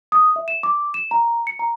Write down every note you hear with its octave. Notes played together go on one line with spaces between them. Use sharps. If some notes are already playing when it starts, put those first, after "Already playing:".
D#6
E5
E7
D6
E7
A#5
C#7
A#5